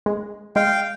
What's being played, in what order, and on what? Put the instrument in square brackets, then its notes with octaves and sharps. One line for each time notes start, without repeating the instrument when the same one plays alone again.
[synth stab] G#3
[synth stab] G#3 [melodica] F5 G5